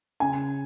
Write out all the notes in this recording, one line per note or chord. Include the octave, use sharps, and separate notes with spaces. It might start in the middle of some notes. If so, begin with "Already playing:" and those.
C#3 G#5